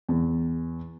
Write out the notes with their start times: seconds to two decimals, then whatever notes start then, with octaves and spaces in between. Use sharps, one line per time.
0.09 E2